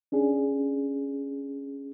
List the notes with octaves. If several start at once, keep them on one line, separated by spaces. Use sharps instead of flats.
C#4 D4 G#4